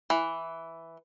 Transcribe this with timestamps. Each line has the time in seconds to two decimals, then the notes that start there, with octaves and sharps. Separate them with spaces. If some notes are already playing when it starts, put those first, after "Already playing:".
0.10 E3